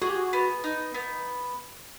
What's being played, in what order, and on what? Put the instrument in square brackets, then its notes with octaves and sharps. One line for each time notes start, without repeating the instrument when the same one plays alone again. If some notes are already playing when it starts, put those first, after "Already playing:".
[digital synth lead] F#4 [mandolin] G#4
[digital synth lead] G4
F#4
[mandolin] B3
D#4
B3